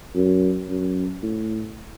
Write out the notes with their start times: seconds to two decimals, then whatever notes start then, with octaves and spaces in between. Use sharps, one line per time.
0.15 F#2
0.68 F#2
1.23 A2